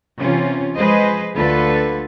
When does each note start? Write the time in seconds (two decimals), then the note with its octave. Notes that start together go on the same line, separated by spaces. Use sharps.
0.17 C3 E3 C#4 F4
0.77 F3 G#3 G#4 B4 C5 D#5
1.34 D2 D3 A3 F4 A4 B4